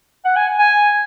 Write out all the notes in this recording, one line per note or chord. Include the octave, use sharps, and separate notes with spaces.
F#5
G#5
G#5